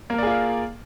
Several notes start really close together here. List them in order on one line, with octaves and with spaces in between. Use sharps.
A#3 A#4 D5 G#4 F4